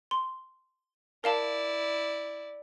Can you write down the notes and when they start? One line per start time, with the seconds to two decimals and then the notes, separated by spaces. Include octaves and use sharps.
0.11 C6
1.24 E4 A#4 D5 F5 A5